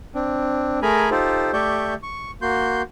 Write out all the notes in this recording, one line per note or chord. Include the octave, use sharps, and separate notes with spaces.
C4 D4
A3 G#4 A#4 G#5 A#5 B5
D#4 F4 G4 A4 C5
A3 G4 D5 E5 C#6 G6
C#6
A#3 F#4 C6 G6